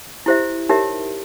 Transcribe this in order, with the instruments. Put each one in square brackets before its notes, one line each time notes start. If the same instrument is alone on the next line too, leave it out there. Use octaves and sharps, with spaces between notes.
[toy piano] E4 G4 C5 E5
D#4 G4 A#4 C#5 E5